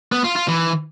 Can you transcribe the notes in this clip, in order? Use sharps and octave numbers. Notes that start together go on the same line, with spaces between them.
B3
F4
F4
E3